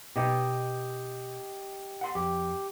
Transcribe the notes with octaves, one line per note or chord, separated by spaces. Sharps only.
B2 B3 D#4 G4 D#5 G5
F#5 C6
F2 G4